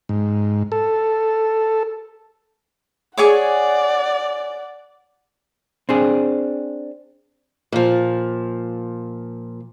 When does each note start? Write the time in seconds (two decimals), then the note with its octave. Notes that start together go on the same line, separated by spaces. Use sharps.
0.09 G#2
0.72 A4
3.17 G#4 C#5 D5 F#5 D6
5.89 C4 D4 G#4
7.72 A#2 F3